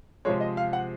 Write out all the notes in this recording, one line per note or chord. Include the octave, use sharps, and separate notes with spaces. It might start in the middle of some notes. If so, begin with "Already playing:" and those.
C3 F3 G#3 C#5
D#5
F5
F#5